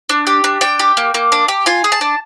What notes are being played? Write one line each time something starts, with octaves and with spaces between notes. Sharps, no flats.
D4
G4
D4
D4 G5
G4
A#3
A#3
D4
G4
F4 G#5
G#4
A5
D4